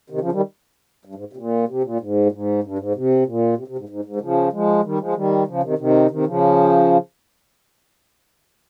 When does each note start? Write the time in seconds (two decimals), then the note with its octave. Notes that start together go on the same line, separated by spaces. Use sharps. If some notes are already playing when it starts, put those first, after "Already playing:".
0.10 C3 D#3
0.21 C#3 F3
0.32 D#3 G3
1.05 G2
1.15 G#2
1.33 C3
1.37 A#2
1.68 C3
1.84 A#2
2.00 G#2
2.26 A#2
2.32 G#2
2.64 G2
2.79 G#2
2.95 C3
3.26 A#2
3.57 C3
3.68 C3
3.78 G#2
3.89 G#2
4.05 G#2
4.16 D#3
4.21 C#3 F3
4.52 F3 G#3
4.84 D#3 G3
5.00 F3 G#3
5.15 D#3 G3
5.47 C#3 F3
5.63 C3 D#3
5.78 C3 D#3
6.10 C3 D#3
6.26 C#3 F3